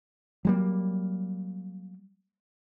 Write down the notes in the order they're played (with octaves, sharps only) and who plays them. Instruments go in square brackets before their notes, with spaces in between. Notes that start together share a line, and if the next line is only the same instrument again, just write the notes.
[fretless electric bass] F#3 G3 A#3